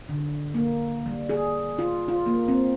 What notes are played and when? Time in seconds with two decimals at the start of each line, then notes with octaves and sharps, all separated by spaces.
0.09 D3
0.54 A#3
1.06 G3
1.29 G#4
1.79 F4
2.08 F4
2.26 A#3
2.48 C4